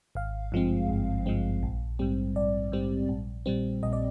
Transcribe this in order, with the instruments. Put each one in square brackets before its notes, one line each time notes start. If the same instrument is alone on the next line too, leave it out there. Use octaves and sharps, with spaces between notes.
[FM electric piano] G#1 F5
G2 F3 G#3 C4
G#1
G2 F3 G#3 C4
A#1
G#2 G3 C4
A#1 D5
G#2 G3 C4
A#1
A#2 G3 C4
A#1 D#5
D5